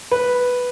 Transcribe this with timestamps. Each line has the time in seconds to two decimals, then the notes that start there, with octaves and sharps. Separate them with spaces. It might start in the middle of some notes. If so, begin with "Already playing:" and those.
0.11 B4